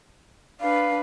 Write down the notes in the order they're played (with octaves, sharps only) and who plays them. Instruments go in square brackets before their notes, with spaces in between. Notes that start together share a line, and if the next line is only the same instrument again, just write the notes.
[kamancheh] D4 B4 [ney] F5